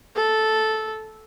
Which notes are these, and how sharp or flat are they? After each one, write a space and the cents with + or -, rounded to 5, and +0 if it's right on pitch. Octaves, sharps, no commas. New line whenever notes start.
A4 -10